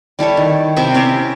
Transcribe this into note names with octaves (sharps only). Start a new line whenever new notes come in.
G3 E4 A4 C#5
D#3
C3 E4 E5 G5
C4 C#4 G4 E5